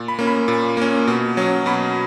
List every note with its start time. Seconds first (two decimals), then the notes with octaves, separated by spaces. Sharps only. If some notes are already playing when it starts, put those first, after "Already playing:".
Already playing: A#2
0.08 B5
0.19 A#3 C#4
0.27 B5
0.48 A#2
0.77 A#3 C#4
1.07 B2
1.37 F#3 C#4
1.66 B2 B5